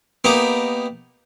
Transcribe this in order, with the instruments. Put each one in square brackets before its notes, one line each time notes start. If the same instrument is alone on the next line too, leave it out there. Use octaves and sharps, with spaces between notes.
[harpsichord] A#3 B3 D#4 G4